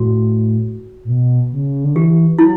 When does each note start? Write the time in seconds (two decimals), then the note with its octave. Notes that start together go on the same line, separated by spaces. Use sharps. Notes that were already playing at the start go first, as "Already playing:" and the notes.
Already playing: A2 F#4
1.04 A2
1.09 B2
1.52 C#3
1.84 D3
1.95 E3 G4
2.38 F#3 E4